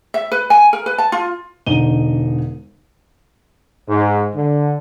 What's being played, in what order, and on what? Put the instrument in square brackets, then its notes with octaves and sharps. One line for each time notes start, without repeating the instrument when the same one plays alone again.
[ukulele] E5
B4
G#5
A#4
B4
A5
F4
[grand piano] E1 D3 D#4 D#7 G7
[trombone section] G#2
D3